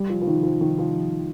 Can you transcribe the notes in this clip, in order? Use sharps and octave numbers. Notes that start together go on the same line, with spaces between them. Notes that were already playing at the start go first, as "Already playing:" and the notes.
Already playing: G3
F3
F3
D#3
F3
D#3
F3